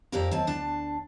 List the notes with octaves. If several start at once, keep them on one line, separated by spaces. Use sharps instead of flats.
F2 A#2 C4 G4 A#4 A#5
D#2 C4 A5
D2 D4 A5